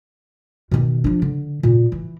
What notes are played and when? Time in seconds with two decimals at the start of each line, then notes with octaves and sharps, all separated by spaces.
0.71 B2 D#3
1.04 F3 D4
1.22 D3
1.63 A#2
1.92 E3